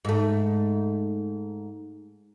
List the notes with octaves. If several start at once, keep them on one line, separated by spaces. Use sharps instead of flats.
G#2 A3